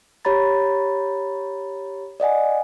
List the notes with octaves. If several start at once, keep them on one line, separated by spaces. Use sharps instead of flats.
G4 C#5 A#5 B5 A6
D5 D#5 F#5 G#5